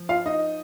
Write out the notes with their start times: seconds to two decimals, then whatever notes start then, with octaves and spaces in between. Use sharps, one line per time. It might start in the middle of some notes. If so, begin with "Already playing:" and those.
Already playing: F3
0.09 F4 F5
0.25 D#4 D#5